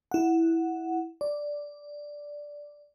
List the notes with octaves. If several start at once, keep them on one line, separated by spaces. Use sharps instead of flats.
E4 F#5
D5